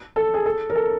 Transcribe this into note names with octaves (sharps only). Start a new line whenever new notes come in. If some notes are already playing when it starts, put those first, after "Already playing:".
A4
G#4
A4
A#4
A4